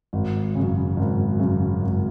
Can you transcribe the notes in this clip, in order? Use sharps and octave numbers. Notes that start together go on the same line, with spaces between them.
G#1
F#2 C#3
G#1
F#2 C#3
G#1